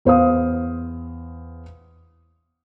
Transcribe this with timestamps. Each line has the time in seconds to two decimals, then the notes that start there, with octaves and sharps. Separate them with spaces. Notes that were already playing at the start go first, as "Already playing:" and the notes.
0.05 E2 C5 F5 D#6